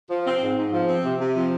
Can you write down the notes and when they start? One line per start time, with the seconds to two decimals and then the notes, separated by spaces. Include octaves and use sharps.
0.09 F3
0.25 C4
0.41 G#2
0.56 G#2
0.72 F3
0.88 C4
1.04 C3
1.19 C3
1.35 F3